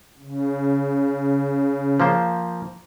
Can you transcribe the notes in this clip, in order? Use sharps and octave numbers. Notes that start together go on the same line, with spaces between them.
C#3
F3 A#3 C5